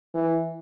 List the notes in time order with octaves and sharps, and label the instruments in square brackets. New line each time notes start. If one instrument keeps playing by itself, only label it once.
[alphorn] E3